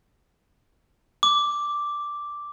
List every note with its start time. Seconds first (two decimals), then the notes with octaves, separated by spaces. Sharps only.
1.23 D6